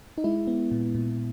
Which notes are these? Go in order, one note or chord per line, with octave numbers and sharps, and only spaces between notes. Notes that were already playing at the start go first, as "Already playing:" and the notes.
D#4
G#3 E4
B3
A#2
A#2